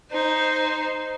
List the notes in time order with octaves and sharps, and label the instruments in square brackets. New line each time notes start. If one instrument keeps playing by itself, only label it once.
[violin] D#4 C5